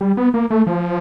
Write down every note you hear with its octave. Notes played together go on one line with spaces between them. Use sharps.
G3
B3
A#3
A3
F3